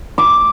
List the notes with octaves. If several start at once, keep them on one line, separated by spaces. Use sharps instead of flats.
D6